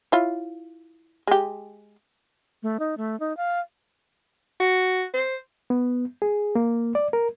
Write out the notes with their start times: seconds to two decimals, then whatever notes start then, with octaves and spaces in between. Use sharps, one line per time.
0.12 E4 F4 C#5
1.27 G#3 G4
2.63 A3
2.79 D#4
2.97 A3
3.20 D#4
3.37 F5
4.60 F#4
5.14 C5
5.70 B3
6.22 G#4
6.55 A#3
6.95 D5
7.13 A#4